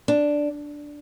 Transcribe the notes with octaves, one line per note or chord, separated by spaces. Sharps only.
D4